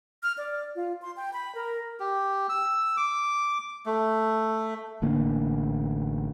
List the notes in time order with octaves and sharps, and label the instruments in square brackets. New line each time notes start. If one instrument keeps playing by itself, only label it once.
[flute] F6
D5
F4
C6
G5
B5
A#4
[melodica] G4
E6
D6
A3
[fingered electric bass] A1 D3 A#3